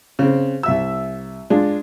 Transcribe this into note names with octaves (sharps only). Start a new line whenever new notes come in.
C#3 C4
C2 E5 E6
G#3 D4 F4